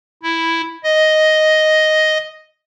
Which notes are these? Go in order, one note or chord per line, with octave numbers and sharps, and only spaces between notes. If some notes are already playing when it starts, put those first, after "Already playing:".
E4
D#5